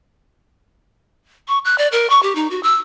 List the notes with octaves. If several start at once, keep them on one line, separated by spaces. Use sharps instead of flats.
C#6
F#6
D5
A#4
C#6
G4
D#4
F#4
E6